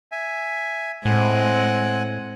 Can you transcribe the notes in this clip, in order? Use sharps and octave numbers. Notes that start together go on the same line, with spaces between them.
E5 G#5
A2 G#3 C4 F#5 G#5